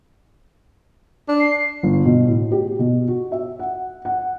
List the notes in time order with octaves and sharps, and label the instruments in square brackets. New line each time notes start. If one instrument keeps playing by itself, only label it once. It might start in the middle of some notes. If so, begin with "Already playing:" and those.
[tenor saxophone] D4
[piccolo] C7
[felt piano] G1
B2
A2
G4
B2
F#4
E5
F#5
F#5